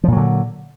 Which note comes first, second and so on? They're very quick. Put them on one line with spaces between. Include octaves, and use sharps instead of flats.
F3 A#2 F#3 D3